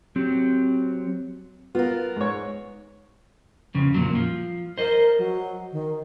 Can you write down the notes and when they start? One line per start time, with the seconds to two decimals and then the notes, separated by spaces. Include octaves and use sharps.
0.16 F#3 C4 G4
1.75 B3 F4 A#4
2.16 G#2 C#5
3.75 F2 C#3
3.94 F2 A#2 F#3
4.15 F3
4.78 A#4 C5 D#5
5.18 F#3
5.72 D#3